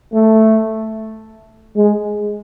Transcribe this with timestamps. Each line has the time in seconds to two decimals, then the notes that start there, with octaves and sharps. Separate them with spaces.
0.13 A3
1.75 G#3